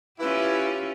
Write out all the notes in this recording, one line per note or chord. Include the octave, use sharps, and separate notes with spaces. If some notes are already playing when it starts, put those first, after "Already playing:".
C#4 E4 F4 G4 B4